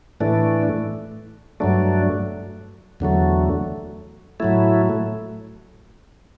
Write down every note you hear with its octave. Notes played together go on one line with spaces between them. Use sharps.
A2 E3 A3 D4
G2 F#3 A3 D4
E2 D3 F#3 A3
A2 F#3 A3 E4